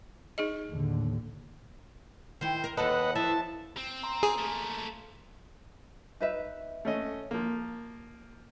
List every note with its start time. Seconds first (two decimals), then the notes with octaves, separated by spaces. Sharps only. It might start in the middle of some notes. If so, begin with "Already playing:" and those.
0.38 D#4 G#4 D#5
0.69 D#2 A2 D3
2.41 D#3 E4 C5
2.64 A#4
2.77 D#2 A4 B4 D#5 F#5
3.15 F3 E4 E5 A5
3.77 C4
4.03 A#5 C6
4.23 G#4
4.38 A3 A#3
6.20 D#4 B4 E5
6.85 A3 C#4 D#5
7.31 F3 A#3